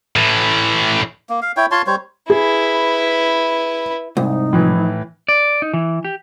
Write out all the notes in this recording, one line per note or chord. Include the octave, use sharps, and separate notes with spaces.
A2 E3
A#3
F5
E4 C#5 G5
F4 C#5 A5 C6
G3 C5 C#5
E4 G#4 B4
C2 G#2 D#4
A2 E3 F3
D5
D#4
E3
G4